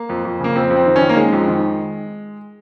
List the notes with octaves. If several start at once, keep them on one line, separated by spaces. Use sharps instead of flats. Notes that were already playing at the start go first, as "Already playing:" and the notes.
Already playing: A#3
F2
F2
C#3 A#3
F2 C4
F2
C4
D#3
C#4
D#3
A#3
D#3 G#3
F2
D#3